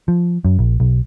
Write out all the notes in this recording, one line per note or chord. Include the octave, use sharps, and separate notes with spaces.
F3
F#2
A#1
B1